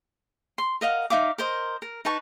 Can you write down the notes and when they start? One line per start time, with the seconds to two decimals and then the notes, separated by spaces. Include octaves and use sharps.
0.58 C6
0.81 A#4 D#5 F5 F#5
1.10 D#4 E5 F5 D6
1.38 A#4 C5 D#5
1.82 A#4
2.05 D#4 B4 A5 C#6